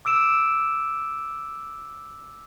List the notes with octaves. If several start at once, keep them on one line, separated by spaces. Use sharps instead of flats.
D6 E6 D7 E7